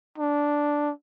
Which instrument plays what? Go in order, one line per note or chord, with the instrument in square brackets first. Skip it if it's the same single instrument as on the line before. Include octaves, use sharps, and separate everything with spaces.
[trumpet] D4